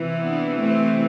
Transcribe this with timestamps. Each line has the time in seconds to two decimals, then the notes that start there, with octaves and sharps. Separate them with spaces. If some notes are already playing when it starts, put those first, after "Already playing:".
Already playing: C3 E3
0.21 B3 D4
0.60 A3 C4